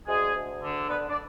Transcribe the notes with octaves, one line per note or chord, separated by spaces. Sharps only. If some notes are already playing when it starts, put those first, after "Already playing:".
D2 G#3 G#4
D2
D3
D3 B3 B4
D4 D5